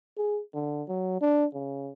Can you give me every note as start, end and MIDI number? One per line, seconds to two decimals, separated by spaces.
0.17 0.41 68
0.54 0.83 50
0.88 1.18 54
1.21 1.46 62
1.54 1.91 49